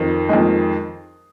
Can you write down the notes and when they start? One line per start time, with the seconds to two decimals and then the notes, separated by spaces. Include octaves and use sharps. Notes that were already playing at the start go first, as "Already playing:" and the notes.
Already playing: F2 D#3
0.29 F2 D#3 G#3